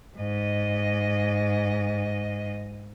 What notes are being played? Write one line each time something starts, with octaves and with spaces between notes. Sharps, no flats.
G#2 D#5